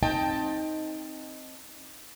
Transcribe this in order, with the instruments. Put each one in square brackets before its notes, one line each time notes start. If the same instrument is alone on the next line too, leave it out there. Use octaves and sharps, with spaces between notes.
[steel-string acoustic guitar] C4 D#4 D#5 G5 A5